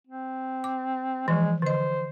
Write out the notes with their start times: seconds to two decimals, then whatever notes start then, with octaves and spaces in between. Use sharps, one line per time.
0.07 C4
0.64 D6
1.28 E3 F3 G#3
1.62 D3 C5 D#5